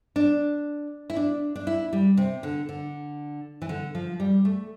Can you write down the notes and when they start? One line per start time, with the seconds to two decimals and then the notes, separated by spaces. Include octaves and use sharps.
0.16 D4
1.10 E4
1.16 D4
1.56 D4
1.67 E4
1.93 G3
2.17 C3
2.43 D3
2.69 D3
3.62 E3
3.69 D3
3.95 F3
4.20 G3
4.45 A3